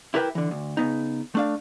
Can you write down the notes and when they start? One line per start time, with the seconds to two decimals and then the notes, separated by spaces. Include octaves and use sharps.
0.14 E4 G4 A#4 B4 E5 G5
0.35 D3 E3
0.51 D2
0.77 C#3 B3 D#4
1.35 A3 D4 F5